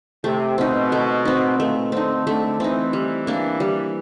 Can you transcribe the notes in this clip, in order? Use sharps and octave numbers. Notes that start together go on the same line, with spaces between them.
C3 A3
B2 C4 D#4
A3
C4 D#4
A#2 A3
D3 C4 D#4
D3 A3
E3 C4 D#4
G3
A#3 D4
G3